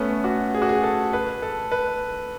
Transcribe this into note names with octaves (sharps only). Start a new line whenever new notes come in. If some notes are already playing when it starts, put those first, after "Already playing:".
Already playing: A3 B3 C#4
F#4
G#4
F#4
G#4
A4
B4
A4
B4